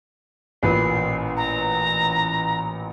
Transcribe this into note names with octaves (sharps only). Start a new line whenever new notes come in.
A1 A#2 B4 C7
A#5